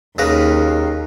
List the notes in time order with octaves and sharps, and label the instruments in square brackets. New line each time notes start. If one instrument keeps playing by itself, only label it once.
[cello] D#2 [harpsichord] C#3 A#4 B4